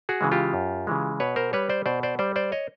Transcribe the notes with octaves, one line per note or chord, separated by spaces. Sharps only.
F#4 G#4
C#3 E3 G#3
F4 G4
F#2
C#3 E3 G#3
B2 B4 C#5
A#4 C5
G3 B4 C#5
C5 D5
B2 C5 D5
C5 D5
G3 C5 D5
C5 D5
C#5 D#5